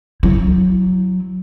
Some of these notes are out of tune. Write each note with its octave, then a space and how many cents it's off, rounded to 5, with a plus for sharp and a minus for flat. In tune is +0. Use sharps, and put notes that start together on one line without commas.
F#3 -5 E4 +0